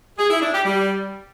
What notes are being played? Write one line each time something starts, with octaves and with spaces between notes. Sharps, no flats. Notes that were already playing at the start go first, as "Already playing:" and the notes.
G#4
E4
D4
G4
G3